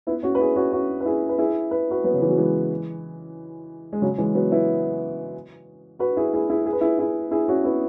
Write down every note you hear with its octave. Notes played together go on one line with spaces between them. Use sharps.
B3 E4
C#4 F#4
B4
E4 G#4
C#4 F#4
C#4 F#4
B4
E4 G#4
B4
E4 G#4
B4
F#4 B4
F#3 B3
C#3
E3
F#3
E3 G#3
G#3
C#3 F#3
E3 G#3
F#3 B3
B3 E4
F#4 B4
E4 G#4
E4 G#4
E4 G#4
G#4
B4
E4 G#4
E4 G#4
E4 G#4
C#4 F#4
B3 E4